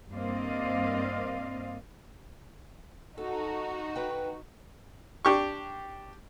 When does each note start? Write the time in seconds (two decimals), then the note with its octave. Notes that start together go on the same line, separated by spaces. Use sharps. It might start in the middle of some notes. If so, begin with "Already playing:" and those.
0.13 G2 A#3 C4 D5 D#5 F5
3.18 D#4 F#4 A4
3.95 B4 G5
5.25 D4 G4 C#6